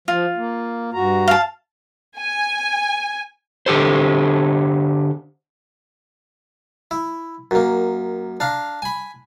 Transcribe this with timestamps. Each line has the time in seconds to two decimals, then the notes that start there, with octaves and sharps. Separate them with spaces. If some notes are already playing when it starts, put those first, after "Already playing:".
0.08 F3 F4
0.37 A#3
0.94 G2 F#4 A#5
1.28 F5 A5
2.19 G#5
3.66 D3 D4 G4 A4 C5
6.91 E4
7.51 F#2 A#3
8.40 D4 F5 A#5
8.82 G#5 B5